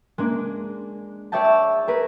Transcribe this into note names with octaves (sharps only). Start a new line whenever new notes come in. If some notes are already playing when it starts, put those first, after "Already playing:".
G#3 A#3 D4
G#4 C#5 D5 E5 G5 A5
E6
G#4 A#4 B4